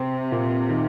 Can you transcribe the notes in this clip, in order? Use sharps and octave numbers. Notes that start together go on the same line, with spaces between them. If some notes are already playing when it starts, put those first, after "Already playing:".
Already playing: C3 C4
A#2
D#3